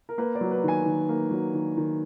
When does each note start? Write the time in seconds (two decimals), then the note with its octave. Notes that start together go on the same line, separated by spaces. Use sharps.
0.09 A#4
0.18 A#3 B4
0.35 D5
0.41 F#3
0.51 B4
0.64 D#3 G#5
0.85 D#3
1.09 A#3
1.31 F#3
1.54 D#3
1.77 D#3